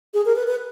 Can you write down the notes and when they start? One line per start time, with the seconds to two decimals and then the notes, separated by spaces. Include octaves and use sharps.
0.14 G#4
0.25 A#4
0.36 B4
0.47 B4